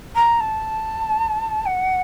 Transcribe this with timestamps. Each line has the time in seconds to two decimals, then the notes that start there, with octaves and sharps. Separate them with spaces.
0.15 A#5
0.40 A5
1.65 F#5